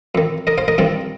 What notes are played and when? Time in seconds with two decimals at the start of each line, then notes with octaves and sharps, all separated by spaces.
0.15 F2 D#3
0.47 A#4 D#5
0.58 C5 F5
0.68 A#4 D#5
0.78 G2 D#3 C4 F4